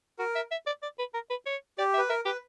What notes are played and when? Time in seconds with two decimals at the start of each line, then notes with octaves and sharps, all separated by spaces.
0.19 F#4 A#4
0.35 E5
0.51 E5
0.67 D5
0.82 D5
0.99 B4
1.14 A#4
1.30 B4
1.46 C#5
1.78 G4 D5
1.94 E5
1.98 B4
2.09 A#4 E5
2.25 G4 B4